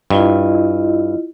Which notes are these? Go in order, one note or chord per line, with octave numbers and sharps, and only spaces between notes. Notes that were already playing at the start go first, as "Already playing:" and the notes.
G2 E4 F4 D#5